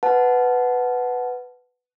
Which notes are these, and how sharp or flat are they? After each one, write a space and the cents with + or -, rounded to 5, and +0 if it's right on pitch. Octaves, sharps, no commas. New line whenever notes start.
B4 +10 F#5 +0 A5 -20